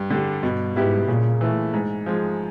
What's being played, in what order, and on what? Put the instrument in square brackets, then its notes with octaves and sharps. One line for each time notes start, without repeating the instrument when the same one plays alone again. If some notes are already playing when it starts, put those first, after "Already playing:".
Already playing: [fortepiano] G2
D3 G3
[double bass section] G2 [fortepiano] B2
[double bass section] G#2 [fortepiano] G3 B3 E4 G4
[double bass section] A#2 [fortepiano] C#3
[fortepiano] E3 A3
G#2
F3 G#3